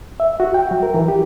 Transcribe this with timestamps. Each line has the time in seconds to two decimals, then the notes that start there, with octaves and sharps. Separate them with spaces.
0.20 E5
0.40 F#4
0.54 G5
0.71 F#3
0.83 A#4
0.94 E3
1.08 G4